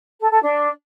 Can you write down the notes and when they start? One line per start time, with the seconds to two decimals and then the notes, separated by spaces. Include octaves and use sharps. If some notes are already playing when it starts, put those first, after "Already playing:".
0.20 A4
0.31 A4
0.41 D4